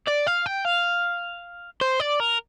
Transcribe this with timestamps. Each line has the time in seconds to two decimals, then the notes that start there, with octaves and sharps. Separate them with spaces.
0.07 D5
0.27 F5
0.46 G5
0.65 F5
1.81 C5
2.00 D5
2.20 A#4